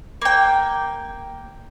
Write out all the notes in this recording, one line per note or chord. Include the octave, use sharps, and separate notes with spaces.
A#3 G5